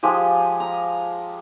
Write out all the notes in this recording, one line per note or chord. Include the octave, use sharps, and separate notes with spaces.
F3 G#3 G4 G#5
A#5